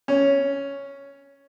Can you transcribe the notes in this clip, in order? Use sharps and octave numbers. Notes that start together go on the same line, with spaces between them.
C#4